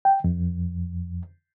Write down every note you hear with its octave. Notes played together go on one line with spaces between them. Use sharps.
G5
F2